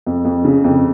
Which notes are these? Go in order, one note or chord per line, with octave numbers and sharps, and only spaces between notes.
F2
F2
C#3
F2